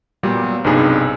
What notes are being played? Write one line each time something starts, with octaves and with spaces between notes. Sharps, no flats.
A#2 F#3 G3 B3
B1 G2 C3 D#4 G#4